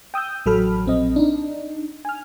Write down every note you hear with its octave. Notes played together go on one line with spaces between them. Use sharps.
G5 D#6 E6 G6
A1 F#3 A4 B5 F6
A#1 C4 D#5
D4 D#4
G#5 F6